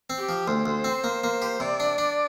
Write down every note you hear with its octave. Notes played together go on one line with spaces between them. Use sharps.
C4
G4
F3
D2 C5
D2
C4
A#3
A#3
G4
C3 D5
D4
D4